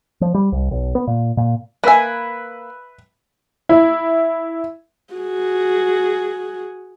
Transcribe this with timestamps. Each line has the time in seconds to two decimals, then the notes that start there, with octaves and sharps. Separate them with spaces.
0.21 F3
0.34 G3
0.52 C2
0.71 B1
0.95 B3
1.07 A#2
1.37 A#2
1.84 A#3 B4 E5 G#5
3.69 E4
5.14 F#4 G#4